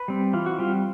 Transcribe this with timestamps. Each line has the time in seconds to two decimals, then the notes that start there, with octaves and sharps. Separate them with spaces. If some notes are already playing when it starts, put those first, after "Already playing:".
Already playing: B4
0.08 G3 C4
0.33 E3 F4
0.46 F#4
0.59 G3 C4 F4